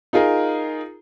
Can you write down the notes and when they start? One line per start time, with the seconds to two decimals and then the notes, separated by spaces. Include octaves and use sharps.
0.13 D#4 F4 G#4 A#4